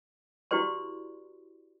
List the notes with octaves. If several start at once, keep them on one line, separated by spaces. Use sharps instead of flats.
E4 F#4 G4 B4 D5 C6